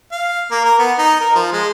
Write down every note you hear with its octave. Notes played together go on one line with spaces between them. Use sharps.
F5
A#3
A#4
B3
D#4
A#4
F3
G#3